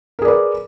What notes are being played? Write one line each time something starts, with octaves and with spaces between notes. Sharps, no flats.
G#4 A#4 B4 D5